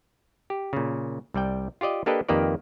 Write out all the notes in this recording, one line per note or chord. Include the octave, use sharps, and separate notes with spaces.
G4
A#2 C#3
C2 G3 D5 G5
F4 G4 D5 D#5
A#3 D4 G4 A4 B4 D#5
F2 D#3 A#3 G4 B4 D5